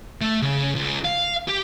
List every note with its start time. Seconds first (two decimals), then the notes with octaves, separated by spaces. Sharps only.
0.21 A3
0.42 C#3
0.75 C#2
1.04 F5
1.48 G4